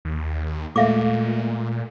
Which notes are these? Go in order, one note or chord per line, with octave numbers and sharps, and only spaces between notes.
D#2
A#2 G#3 A3 E5 F5 D6